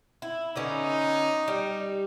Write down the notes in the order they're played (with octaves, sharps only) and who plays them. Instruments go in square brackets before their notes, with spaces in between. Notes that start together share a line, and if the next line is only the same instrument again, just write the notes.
[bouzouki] E4
[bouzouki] D3 B3 C#4 [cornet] D#4
[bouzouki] G3